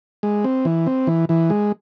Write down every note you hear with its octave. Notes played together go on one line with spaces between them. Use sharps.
G#3
C4
E3
C4
E3
E3
G#3